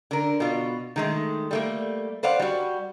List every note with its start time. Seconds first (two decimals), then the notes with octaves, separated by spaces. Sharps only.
0.11 D3 A#4
0.40 B2 F4
0.96 D#3 G#3 A3
1.51 G3 A3 A#3
2.23 B4 C5 D5 F5 F#5
2.39 G3 F#4